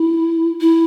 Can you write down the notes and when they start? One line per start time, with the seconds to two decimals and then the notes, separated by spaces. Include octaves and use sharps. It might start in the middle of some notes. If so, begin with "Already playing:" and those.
Already playing: E4
0.61 E4